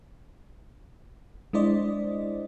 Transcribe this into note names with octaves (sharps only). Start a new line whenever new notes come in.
G#3 D4 E4 C5 D5 D#5